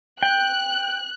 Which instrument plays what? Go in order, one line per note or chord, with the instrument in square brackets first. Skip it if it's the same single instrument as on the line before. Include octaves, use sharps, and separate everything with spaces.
[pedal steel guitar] G5 [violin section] F#6